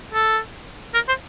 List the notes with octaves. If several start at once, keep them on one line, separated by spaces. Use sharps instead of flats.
A4
A#4
C5